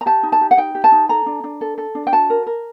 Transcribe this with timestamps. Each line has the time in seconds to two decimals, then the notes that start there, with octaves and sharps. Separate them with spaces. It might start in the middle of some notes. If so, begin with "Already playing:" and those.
0.01 A#5
0.06 G4 A5
0.23 D#4
0.32 A5
0.41 G4
0.51 F#5
0.57 D#4 G5
0.75 G4
0.84 A5
0.92 D#4
1.09 A4 A#5
1.26 D4
1.44 D4
1.61 A4
1.78 A4
1.95 D4
2.07 G5
2.12 F#4 A5
2.30 A#4
2.46 A#4